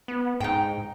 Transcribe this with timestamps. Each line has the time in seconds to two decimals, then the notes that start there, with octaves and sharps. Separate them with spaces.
0.08 B3
0.40 G#2 D#4 G5